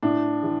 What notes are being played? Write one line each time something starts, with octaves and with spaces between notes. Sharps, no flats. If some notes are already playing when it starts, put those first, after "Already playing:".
A2 D4
E3